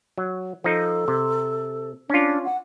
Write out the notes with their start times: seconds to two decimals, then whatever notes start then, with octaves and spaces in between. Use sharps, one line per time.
0.18 F#3
0.64 F3 D#4 A4
1.08 C3
2.10 C#4 D4 F4
2.45 F#5